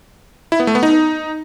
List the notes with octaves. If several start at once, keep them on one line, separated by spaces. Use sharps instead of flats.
E4
B3
A3
B3
D#4